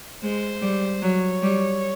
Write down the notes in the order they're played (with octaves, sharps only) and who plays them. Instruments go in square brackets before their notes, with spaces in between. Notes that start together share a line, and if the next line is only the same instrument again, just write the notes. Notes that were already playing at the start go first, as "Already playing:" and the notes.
[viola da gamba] G#3 [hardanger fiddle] C5
[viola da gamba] G3
[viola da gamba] F#3 [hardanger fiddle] C#5
[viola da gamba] G3